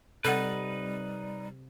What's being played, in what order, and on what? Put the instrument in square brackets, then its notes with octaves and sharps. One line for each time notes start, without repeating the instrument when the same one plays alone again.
[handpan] C3 [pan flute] G3 [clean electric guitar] D#4 B4 [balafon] A4 F#5